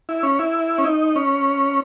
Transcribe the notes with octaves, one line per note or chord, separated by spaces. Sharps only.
E4
C#4
E4
C#4
D#4
C#4